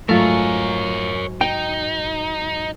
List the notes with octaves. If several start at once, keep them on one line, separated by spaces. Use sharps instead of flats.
G#2 F#3 A3 F4 A#4 C#5 G#5
D#4 G5